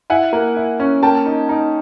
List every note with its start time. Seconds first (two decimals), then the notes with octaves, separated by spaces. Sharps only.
0.10 E4 F#5 G#5
0.33 A#3
0.56 E4
0.80 C#4
1.03 A#3 G5 A5
1.26 D#4
1.49 D#4